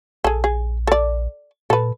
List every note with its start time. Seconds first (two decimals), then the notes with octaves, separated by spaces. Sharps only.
0.24 A#1 G#4 A4
0.44 G#4
0.87 A4 D5
1.70 A#2 A4 B4